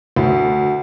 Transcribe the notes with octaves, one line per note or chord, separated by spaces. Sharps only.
D2